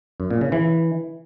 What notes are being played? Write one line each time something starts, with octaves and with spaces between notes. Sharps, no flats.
F#2
A#2
C#3
E3